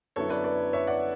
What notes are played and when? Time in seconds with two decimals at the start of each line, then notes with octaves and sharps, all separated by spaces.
0.16 F#2 D3 F#3 B3 E4 A4 C#5
0.30 B4 D5
0.44 B4 D5
0.73 C#5 E5
0.87 D5 F#5